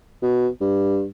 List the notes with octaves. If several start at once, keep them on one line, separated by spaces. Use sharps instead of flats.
B2
G2